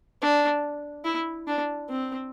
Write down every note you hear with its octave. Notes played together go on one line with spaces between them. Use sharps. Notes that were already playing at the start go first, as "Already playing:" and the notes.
D4
E4
D4
C4